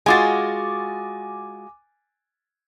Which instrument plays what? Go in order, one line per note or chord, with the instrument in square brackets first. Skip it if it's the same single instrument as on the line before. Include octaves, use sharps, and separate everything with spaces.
[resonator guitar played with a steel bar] G#3 F4 F#4 [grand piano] G#5 D6 A6